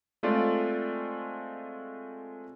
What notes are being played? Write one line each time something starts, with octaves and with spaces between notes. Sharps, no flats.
G#3 A3 C4 F4 D5